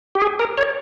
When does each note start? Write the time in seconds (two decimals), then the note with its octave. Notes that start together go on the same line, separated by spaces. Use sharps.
0.15 G4
0.22 G#4
0.39 A#4
0.58 C#5